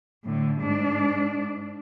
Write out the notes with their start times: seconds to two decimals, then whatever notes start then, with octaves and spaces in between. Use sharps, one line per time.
0.24 A2 D3
0.61 G#2 D4